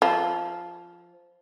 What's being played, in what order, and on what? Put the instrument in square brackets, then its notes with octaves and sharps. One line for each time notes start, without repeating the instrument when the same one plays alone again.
[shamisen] F3